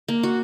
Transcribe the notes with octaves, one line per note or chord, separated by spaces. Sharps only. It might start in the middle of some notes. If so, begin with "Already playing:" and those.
A#3
F#4